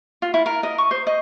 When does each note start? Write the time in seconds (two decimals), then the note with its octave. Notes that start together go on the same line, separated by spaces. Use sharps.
0.22 F4
0.34 E4
0.46 A#4
0.63 D#5
0.78 C#6
0.91 C5
1.07 D#5